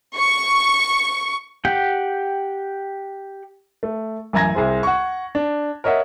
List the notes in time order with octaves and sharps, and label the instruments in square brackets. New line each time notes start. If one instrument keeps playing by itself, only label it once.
[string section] C#6
[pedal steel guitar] G4 F#5 G5
[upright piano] A3
A1 F#2 G#5 A#5 G#6 A#6
C2 G#4 C5
F#5 C#6
D4
A#4 C#5 D#5 E5 F#5